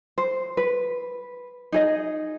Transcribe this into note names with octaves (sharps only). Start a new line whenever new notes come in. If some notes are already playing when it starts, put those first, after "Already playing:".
C5
B4
D#4 G#4 D#5